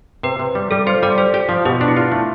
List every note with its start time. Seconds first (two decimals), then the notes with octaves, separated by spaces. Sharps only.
0.23 C3 B4
0.39 C3
0.55 G3
0.71 G3 A4
0.87 F4 C5
1.03 G3 D5
1.18 G4 C5
1.34 G4
1.49 F3
1.65 B2 G4
1.81 D4
1.88 E4
1.96 F4
2.11 A3 E4